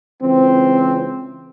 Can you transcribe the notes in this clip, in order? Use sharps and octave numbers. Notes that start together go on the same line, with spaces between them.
C#2 E3 C4